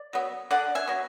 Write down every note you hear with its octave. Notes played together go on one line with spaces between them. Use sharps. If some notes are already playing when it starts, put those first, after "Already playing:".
Already playing: D5
F#3 B3
D3 D5 F#5
E5 G#5
F#3 B3